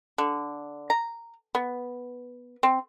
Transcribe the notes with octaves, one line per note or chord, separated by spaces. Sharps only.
D3
A#5
B3
C4